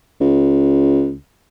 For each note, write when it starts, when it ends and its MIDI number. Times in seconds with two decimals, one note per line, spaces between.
0.21 1.13 37